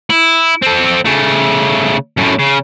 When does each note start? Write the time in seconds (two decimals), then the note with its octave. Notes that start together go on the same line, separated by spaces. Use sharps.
0.10 E4
0.62 C4 A4
1.05 C#3 A3
2.17 F#2 A2
2.39 C#3